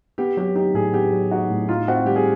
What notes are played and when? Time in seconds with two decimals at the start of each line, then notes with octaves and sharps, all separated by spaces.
0.18 B3 G4
0.37 F#3 G4
0.56 D#4 G4
0.74 A2 G#4
0.93 B3 G4
1.13 F#3
1.31 D#4 F#4
1.50 A2
1.69 D#4 F4
1.88 C4 F#4
2.06 G3 G4
2.16 G#4